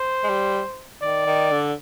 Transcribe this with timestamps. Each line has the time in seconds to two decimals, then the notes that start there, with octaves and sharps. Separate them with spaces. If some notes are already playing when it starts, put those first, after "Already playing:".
Already playing: C5
0.24 G#3
0.29 G3
1.02 D#3 D5
1.26 D#3
1.51 D3